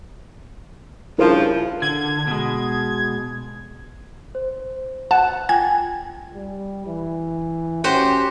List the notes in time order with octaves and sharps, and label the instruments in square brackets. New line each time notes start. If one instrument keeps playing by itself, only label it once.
[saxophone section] G2 C#3 F3 [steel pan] E4 A#4 C5
[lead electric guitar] D3 [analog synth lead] G#6
[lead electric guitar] B2 G#3
[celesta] C5
[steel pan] F#5 [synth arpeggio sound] A5
[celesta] F4 G5 [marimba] G#5 [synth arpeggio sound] G#6
[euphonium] G3
E3
[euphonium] C#4 [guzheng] F#4 G4 C5